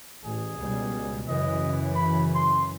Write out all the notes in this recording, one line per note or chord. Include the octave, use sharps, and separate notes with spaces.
A1 G#4
C#2 B2 G3
F#2 C#3 E3 D#5
B5
C6